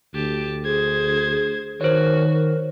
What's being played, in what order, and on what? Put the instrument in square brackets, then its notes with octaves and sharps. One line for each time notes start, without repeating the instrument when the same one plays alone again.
[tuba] D2 [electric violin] G4 A5
[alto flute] G#4 [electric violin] C5 G#6
[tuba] D#3 [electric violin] F#4 [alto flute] A#4 [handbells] C5 C#5
[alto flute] A#4